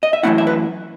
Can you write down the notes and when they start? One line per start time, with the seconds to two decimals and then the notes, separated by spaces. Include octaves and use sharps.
0.03 D#5
0.13 E5
0.23 F#2 E3 A3 C#4 E4 F#5
0.38 E5
0.47 B4